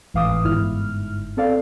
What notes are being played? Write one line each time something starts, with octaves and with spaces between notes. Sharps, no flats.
G#1 A2 E3 F5 D6 D#6
G1 G#2 E4 F6
C4 A4 D5 F5